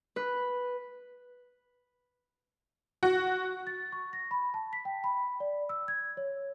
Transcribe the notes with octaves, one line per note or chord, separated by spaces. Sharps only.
B4
F#4
A6
C#6
A#6
B5
A5
B6
G5
B5
D5
E6
G#6
C#5